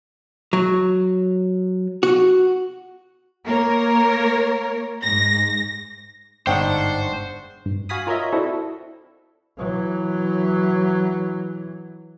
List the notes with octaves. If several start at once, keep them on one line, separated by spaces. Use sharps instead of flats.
F#3
F#4
A#3 A#4 C#5
G#2 A#6
G1 G#2 D4 D#4 C5 F#5 G5 C#6
G2
F#4 F5 G#5 B5 D#6
F4 A#4 C#5 D#5 E5
C4 D4 E4 F#4 A4
E3 F#3